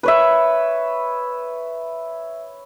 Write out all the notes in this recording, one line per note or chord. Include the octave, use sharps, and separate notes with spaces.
B4 C#5 E5